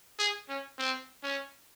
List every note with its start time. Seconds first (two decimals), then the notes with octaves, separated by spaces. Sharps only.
0.19 G#4
0.49 C#4
0.78 C4
1.23 C#4